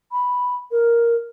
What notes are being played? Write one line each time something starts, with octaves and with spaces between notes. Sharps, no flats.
B5
A#4